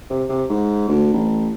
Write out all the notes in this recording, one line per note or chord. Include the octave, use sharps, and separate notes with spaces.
C3
C3
G#2
D2
A1